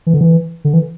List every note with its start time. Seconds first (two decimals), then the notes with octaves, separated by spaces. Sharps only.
0.07 E3
0.14 D3
0.21 E3
0.65 D3
0.74 E3